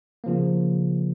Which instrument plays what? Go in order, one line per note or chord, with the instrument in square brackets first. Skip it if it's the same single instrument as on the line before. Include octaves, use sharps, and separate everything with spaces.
[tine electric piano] C#3 F3 A#3